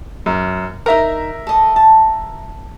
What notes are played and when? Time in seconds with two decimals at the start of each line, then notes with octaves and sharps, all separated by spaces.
0.26 F#2
0.86 D#4 A#4 E5 A#5
1.47 A4 D#5
1.76 A5